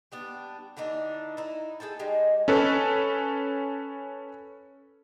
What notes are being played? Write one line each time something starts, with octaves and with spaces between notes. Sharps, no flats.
G3 B3 D4
D3 E3 D4 D#4
D#4 E4
G#4 A4 G5 A5
G3 G#3 D#4
C#4 A4 B4